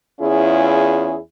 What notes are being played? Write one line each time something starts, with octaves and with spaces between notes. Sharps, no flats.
E2 C#4 E4 F4 G#4